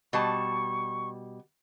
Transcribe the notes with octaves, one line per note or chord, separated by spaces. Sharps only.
B2 G3 A5 C#6